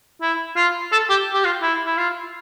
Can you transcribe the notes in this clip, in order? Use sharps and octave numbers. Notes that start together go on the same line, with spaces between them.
E4
F4
A4
G4
G4
F4
E4
E4
F4